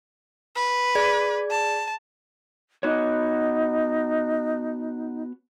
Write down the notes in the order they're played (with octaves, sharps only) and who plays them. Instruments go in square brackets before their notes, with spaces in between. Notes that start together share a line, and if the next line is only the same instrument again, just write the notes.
[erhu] B4
[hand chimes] G#4 D5 G#6
[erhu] A5
[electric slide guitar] B3 F#4 C#5 [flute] D#4